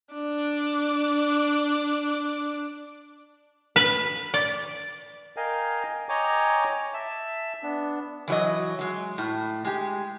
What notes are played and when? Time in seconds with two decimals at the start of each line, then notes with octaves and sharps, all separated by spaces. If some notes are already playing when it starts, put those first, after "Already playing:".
0.14 D4 D6
3.76 B4
4.34 D5
5.37 A#4 D#5 F5 G5 G#5
6.09 C#5 D#5 G5 G#5 A#5 D6
6.94 E5 A5
7.63 B3 D4
8.28 E3 F#3 D#5
8.79 F#3 G#3
9.18 A2
9.65 G#3 G4